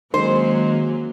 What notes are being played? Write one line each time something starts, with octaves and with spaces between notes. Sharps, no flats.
D#3 F#3 G#3 A#3 C#4 C5